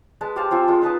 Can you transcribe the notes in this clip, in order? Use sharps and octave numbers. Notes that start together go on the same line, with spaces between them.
G#3 B4 A5
G4 C5 F5 A5
F3 C4 F4 G#5
G#3 F4
D#4 B4 A5 D#6